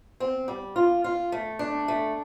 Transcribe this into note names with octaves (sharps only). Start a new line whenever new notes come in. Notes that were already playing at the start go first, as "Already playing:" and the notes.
C4
G3
F4
F4
A3
D4
A3